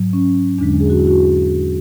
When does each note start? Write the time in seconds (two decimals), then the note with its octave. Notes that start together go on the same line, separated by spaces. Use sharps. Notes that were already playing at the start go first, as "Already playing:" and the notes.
Already playing: G#2 F#3
0.13 C#4
0.58 E2 D3 G#3 D4
0.80 G#4
0.90 F#4
0.99 E4
1.07 F#4